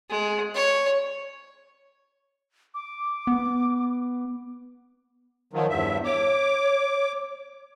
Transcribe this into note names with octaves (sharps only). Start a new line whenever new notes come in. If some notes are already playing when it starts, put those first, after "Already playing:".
G#3
C#5
D6
B3
D#3 F3 F#3
E2 G2 E5
C#5 D6